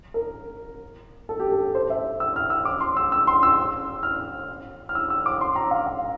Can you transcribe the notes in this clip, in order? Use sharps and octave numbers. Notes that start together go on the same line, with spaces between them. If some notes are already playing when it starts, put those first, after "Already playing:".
A#4
A4
G4
A4
A4
C5
E5
E6
F6
E6
D6
C6
E6
E6
C6
E6
F6
F6
E6
E6
D6
C6
A#5
F5
F5